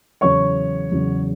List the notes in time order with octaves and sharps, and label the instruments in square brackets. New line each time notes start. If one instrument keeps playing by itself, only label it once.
[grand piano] E2 C#3 F#3 C#5 C#6
E2 C#3 F#3